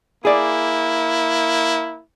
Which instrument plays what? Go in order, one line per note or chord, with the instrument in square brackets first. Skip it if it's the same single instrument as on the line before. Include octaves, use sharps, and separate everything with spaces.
[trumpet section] A#3 E4 [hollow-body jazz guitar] G#4 D5